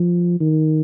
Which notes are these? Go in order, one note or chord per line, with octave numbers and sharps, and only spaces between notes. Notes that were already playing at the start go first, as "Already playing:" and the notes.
Already playing: F3
D#3